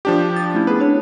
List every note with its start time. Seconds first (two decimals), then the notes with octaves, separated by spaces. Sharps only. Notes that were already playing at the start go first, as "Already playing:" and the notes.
0.05 F3 D4 G4
0.36 A6
0.54 A3 C#4 E4
0.67 B3 G#4 B4
0.79 C4 D4 C#5